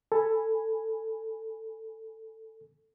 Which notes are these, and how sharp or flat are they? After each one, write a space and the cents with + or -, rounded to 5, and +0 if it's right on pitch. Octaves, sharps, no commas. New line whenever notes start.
A4 +10 G#5 +0 B5 +0